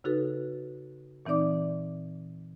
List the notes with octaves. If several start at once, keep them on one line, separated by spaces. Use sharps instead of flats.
C#3 D#4 F#4 A4 B4
A#2 E3 C4 D#4 D5 D6